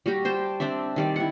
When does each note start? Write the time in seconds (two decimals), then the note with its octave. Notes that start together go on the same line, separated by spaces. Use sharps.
0.06 G3 F#4 G4 A#5
0.25 C5 G5 A5
0.60 C4 D4 D5 E5
0.96 D#3 G3 D5
1.16 E4 F#5